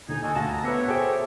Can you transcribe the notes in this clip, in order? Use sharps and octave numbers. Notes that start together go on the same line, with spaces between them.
D#2 D3 D#4 G#5
D4 F#4 A4 D#5 G#5 D#6
D2 F5 A5 A#6
A#5
B3 G4 B4 C#5 E5 A#6 C#7
F#4 G#4 A4 C5 G5